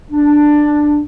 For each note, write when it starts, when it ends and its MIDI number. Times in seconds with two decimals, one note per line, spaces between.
0.12 1.00 62